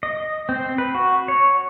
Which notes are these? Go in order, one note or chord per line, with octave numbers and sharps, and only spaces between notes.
D#5
C4
B4
F#4
C#5